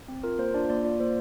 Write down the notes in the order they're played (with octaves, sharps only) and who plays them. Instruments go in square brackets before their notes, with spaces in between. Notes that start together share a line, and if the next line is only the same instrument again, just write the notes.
[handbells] C4
F4 A#4
A#3 C5
D4 F4 D5
A#3 D5
F4 D5
A#3 C5